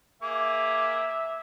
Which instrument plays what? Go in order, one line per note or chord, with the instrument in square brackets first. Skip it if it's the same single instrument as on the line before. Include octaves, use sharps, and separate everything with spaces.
[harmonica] A#3 G#4 D6 [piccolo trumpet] E5